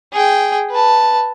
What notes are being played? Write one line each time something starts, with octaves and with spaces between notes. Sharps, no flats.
G#4 G5
B4 A5